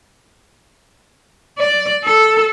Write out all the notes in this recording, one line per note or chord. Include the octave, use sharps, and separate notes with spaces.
D5
A4